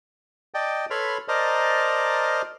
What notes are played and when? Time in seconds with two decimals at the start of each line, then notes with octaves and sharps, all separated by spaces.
0.54 D5 D#5 G5 A5
0.90 A4 B4 C#5 B5 C6 F6
1.28 A#4 C5 D5 D#5 A5 A#5